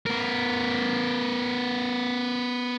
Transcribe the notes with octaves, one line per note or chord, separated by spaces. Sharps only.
B3 A#4